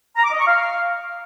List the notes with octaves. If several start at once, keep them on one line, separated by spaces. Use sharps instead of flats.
A#5
D6
D#5
C#6
F5